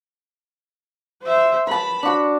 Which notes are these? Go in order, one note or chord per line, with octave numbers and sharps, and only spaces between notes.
C5 E5
B4 A5 B5
D4 F#4